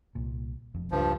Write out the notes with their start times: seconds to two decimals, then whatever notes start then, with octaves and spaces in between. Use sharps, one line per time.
0.15 C2 A#2
0.74 E1 F2
0.92 C#2 G2 C#3 F3